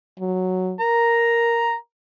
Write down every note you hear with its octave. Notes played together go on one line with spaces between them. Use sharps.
F#3
A#4 A#5